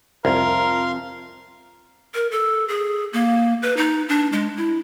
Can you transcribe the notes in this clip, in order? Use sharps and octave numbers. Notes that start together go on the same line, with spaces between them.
C2 F2 A#4 F5 C6
A#4
A4
G#4
A#3
B4
D#4
D4
G#3
E4